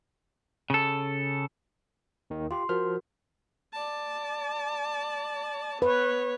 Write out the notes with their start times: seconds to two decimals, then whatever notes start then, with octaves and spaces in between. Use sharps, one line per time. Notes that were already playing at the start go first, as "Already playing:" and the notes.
0.70 C#3 A4
2.30 D#2 D#3
2.51 F4 G4 C6
2.69 F3 F#4 A#4 F6
3.73 D5 A5
5.82 B3 B4 C#5